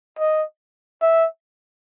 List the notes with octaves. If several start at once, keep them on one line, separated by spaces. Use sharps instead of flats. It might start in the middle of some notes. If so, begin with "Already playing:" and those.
D#5
E5